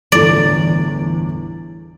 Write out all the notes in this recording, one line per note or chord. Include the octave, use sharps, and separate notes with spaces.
G1 E2 A2 D5